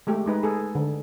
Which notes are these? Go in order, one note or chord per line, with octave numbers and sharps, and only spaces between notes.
G#3 A3 G4
G#3 D#4 B4
G#4 A4
D3